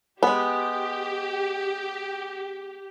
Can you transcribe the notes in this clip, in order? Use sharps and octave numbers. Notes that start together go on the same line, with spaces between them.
G#3 B3 G4